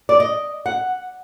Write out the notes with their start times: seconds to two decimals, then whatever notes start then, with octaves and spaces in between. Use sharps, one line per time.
0.09 D5
0.20 D#5
0.66 F#5